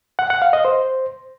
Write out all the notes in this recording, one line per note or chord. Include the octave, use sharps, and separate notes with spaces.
F#5
F#5
F5
D#5
C5